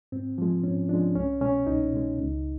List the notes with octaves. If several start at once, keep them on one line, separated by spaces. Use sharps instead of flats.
G#2 C4
F3 G#3
G#2 C#4
F3 G#3 D4
C2 C#4
B2 G#3 C#4
C2 D#4
B2 G#3
C#2